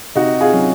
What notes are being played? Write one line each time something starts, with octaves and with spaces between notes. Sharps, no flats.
C3 D#4 F#4
F4 G#4
F#3 C#4